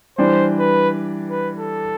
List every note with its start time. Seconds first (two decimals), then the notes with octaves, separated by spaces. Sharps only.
0.18 E3 G3 D4 C5
0.60 B4
1.30 B4
1.58 A4